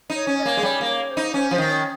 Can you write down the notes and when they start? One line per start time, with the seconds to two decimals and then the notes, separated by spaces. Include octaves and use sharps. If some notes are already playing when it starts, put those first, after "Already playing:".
0.10 D#4
0.15 C#5
0.27 C#4
0.39 D#5
0.43 A#3 C#5
0.57 G#3
0.63 G3 C#5
0.81 A#3
0.87 C#5
1.11 C5
1.17 D#4
1.34 C#4 C5
1.51 F3 C5
1.58 D#3
1.70 C#5